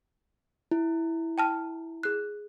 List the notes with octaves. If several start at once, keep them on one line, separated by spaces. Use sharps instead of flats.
E4
G5 A5 F6
G#4 F#6